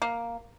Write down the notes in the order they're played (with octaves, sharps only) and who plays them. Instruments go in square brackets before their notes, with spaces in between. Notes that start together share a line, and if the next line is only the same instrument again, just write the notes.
[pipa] A#3